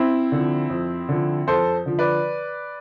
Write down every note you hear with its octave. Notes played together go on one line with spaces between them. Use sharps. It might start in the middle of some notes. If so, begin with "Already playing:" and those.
Already playing: C4 E4
D3 F3
F2
D3 F3
F2 A4 C5
D3 F3
B4 D5